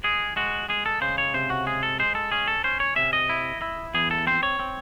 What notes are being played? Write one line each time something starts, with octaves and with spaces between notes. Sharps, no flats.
G#3 G#4
G#3 F#4
G#3 G#4
A4
C#3 C5
C#5
C3 C5
F#4
G#3 G#4
A4
G#3 C5
A4
C#4 G#4
A4
C#4 C5
C#5
C3 E5
D#5
E4
E4
E2 G#4
A4
C4 C5
C#5
C4